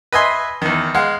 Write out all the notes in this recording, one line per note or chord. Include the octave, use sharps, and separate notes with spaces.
B4 D#5 E5 G#5 C6
E2 D#3
G#3 F5 F#5